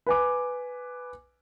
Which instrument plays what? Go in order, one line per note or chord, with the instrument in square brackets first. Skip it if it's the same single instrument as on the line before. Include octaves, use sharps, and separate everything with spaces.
[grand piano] B4 G#5 D6